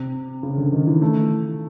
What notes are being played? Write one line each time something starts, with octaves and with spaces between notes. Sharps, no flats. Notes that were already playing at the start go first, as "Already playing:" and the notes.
Already playing: C3
C#3
D3
D#3
E3
A3